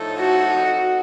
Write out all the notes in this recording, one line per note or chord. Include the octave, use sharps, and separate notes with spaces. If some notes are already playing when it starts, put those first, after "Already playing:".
Already playing: A2 F3 A3 D#4 A4
F#4
F3 C4 D#4 A4